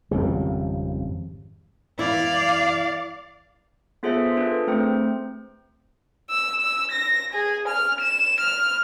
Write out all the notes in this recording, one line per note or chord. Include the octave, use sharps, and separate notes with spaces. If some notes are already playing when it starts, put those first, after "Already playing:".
G#1 F2 C#3 G3
E3 E4 D5 F5
B3 F4 G#4 A4 C5 E5
D4 F4 G#4 A4 B4
A3 C4 C5 G5
E6
E6
A#6
G#4
F6
E7
F6